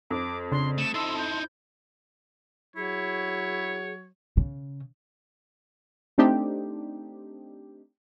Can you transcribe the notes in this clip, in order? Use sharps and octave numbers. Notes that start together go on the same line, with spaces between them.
F2 D6
C#3 D4 C6
A3 E7
D#4 E4 A5 C6 E6
G6
F#3 E4 G#4 C#5
C#3
A3 C4 D4 D#4 G4